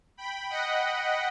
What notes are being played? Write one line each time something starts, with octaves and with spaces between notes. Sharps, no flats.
G5 B5
D#5 F#5